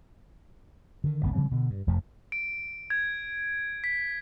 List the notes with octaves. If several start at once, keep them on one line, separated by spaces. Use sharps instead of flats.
D3 D#3
G1 C#2 D#3 B3
C#3 F3 G3 C4
B2 D3
G2
F1 F2 F3 A3
D7
G#6
B6